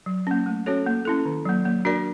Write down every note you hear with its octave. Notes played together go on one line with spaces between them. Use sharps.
F#3
A#3 C#4
A3
C#4 F#4 A4 C#5
A#3
C#4 E4 A4
D#3
F#3 A#3
A#3
D4 F#4 A#4 D5